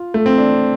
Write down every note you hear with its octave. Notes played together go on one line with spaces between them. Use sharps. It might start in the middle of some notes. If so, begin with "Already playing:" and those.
Already playing: F4
A3
C4
D4